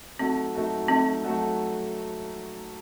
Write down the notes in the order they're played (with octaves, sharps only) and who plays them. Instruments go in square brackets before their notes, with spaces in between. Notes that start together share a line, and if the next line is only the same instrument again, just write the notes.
[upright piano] F#3 A3 D#4 F#4 A4 [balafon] C4
[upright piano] F#3 A3 D#4 F#4 A4
[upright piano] F#3 A3 D#4 F#4 A4 [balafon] C4
[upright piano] F#3 A3 D#4 F#4 A4